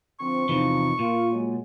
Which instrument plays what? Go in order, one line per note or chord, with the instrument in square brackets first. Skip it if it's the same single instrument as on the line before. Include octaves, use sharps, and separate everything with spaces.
[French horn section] D3 F3 C4 [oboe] C#6
[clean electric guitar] E2 C3 E3 [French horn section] F3 D#4
[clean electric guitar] A#2 [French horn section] A#3 F4
[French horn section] F#3 G#3